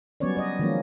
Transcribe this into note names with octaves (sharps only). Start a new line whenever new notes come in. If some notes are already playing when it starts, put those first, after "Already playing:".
F#3 G3 B3 C#4 C#5 D5
D5 D#5
D#3 F3 F#3 G#3 A#3 C#4